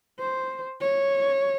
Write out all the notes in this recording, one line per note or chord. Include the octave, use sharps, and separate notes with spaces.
C5
C#5